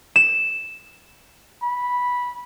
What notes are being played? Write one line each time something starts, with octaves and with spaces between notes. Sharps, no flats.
E7
B5